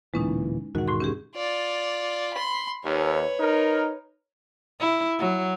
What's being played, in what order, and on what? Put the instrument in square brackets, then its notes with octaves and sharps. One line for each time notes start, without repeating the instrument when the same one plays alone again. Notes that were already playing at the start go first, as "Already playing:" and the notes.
[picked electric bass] D1 A#2 E3 [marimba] G#3 C#4 D#4
[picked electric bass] E1 G#2 D#3 [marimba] F#4 F#5
[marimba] A2 F#4 C6
C#4 G4 G#4
[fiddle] F4 D5
B5 C6
[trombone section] D#2 [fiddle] B4 C#5
[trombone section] D#4 A#4
[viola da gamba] E4
F#3